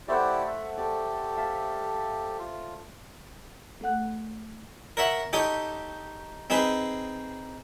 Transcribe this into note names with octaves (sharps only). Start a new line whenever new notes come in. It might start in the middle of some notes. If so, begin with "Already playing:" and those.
A3 E4 G4 C5 D5 F#5
E5
G4 A4 D5
E5 F5 A5
F4
A3 A4 F#5 F#6
A#4 C#5 E5 F#5
D#4 G4 A4 C#5 D#6
C4 D#4 G#4 B4